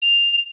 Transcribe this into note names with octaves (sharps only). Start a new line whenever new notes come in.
F7